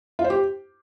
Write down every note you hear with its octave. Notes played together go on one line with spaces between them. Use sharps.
F4
C5
G4